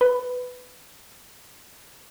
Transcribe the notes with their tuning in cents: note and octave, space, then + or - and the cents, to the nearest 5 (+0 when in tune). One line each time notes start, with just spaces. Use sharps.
B4 +10